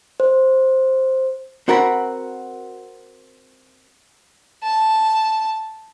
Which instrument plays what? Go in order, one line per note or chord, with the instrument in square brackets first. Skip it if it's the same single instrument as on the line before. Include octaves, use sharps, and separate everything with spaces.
[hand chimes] C5
[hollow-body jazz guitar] C4 F#4 A#4 F#5 A5 B5
[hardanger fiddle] A5